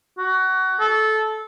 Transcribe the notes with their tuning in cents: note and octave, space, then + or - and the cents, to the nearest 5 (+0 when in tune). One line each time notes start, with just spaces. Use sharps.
F#4 +20
A4 -20